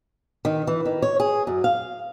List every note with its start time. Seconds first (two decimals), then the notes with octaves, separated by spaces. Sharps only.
0.45 D#3
0.67 E3
0.86 D#3
1.02 C#5
1.20 G#4
1.47 F#2
1.64 F5